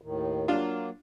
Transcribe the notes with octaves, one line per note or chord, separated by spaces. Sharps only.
D#2 A2 D#3
F#3 A#3 D4 F4